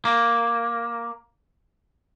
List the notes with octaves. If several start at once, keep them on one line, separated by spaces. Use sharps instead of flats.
A#3